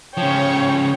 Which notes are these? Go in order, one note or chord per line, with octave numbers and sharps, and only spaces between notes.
C#3 F3 C#5 G5